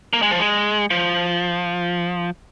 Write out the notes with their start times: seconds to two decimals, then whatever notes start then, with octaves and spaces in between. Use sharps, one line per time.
0.13 A#3
0.22 G#3
0.31 F3
0.39 G#3
0.90 F3